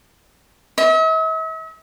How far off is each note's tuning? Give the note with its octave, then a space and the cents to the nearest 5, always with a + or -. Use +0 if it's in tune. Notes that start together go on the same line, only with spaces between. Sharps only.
E5 -45